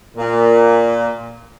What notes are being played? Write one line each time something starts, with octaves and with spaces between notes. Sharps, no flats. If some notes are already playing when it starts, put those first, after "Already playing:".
A#2